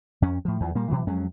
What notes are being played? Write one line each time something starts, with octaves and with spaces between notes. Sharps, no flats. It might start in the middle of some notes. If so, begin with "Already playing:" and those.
F2 C#4
A2 F3
E2 E3 F3
A#2 G3 A#3
B2 E3 F#3
F2 F#3 G#3 C#4